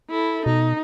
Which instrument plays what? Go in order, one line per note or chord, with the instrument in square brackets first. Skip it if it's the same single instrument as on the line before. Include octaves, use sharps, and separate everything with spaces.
[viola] E4 A4
[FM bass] B2 [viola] D#4